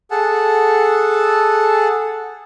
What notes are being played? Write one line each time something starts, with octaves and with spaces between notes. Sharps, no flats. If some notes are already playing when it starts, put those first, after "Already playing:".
G#4 A4 F#5 A5